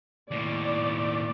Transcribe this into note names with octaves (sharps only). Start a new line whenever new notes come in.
D#2 A2 D5